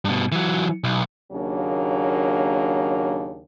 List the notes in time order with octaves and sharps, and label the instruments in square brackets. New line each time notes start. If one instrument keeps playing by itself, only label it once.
[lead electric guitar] G2 B2
E3 F#3
B1
[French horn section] D#2 C#3 F#3 A#3 D4